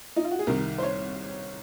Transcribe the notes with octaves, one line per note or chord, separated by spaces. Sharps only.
D#4
F4
F#4
G#4
C2 C3 D#3 A#4
C5
C#5